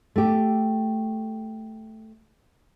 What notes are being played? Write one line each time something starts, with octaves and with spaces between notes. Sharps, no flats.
A3 G4